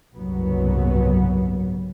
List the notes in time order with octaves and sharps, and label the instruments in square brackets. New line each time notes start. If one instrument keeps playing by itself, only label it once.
[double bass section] F#1 C2 G#2 F#3 B3